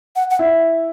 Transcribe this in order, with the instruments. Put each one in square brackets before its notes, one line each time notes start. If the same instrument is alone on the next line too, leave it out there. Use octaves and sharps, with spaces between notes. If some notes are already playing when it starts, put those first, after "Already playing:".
[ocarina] F#5
F#5
[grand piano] E4